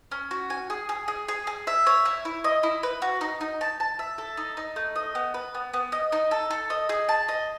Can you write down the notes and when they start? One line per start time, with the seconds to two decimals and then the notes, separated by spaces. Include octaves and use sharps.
0.11 C#4
0.31 F#4
0.50 G#5
0.70 G#4
0.89 G#4
1.08 G#4
1.28 G#4
1.47 G#4
1.67 E5
1.87 C#5
2.05 E4
2.25 E4
2.44 D#5
2.63 E4
2.83 B4
3.02 F#4
3.21 D#4
3.41 D#4
3.61 A5
3.80 A5
3.99 E5
4.18 A4
4.37 D#4
4.57 D#4
4.76 A3
4.96 D#5
5.15 B3
5.34 B4
5.55 B3
5.73 B3
5.92 D#5
6.12 D#4
6.31 A4
6.51 A4
6.70 D#5
6.89 G#4
7.09 A5
7.28 D#5